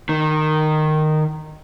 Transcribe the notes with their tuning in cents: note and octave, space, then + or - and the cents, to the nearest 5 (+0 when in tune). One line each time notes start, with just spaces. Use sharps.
D#3 -15